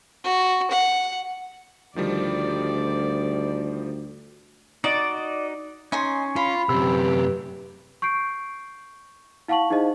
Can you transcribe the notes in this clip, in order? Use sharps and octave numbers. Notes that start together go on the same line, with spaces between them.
F#4
F#5
D2 D#3 F3 G3 D5
D#4 F#4 D5 D#5
C#4 D#4 G#5 C6
F4 B5
F#2 C3 G4 B4 E6
C#6 G6 C7 D7
E4 F5 F#5 A5 C#6 F#7
D#4 E4 G#4 C5 D#5 F5